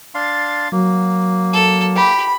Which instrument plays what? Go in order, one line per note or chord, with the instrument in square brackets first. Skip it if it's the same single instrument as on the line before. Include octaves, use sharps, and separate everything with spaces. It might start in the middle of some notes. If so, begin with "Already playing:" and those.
[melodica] D4 F5 C6 [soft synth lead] A6
[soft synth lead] F#3 [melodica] A#3
[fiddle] A4
[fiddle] G4 [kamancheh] B5